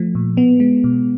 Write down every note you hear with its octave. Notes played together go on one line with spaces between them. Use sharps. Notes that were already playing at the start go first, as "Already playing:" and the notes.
Already playing: F3 A3
A#2
B3
G#3
B2